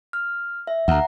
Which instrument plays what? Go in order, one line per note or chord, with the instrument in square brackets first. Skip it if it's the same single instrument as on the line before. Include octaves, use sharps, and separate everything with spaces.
[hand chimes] F6
E5
[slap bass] D2 [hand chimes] F#5 A#5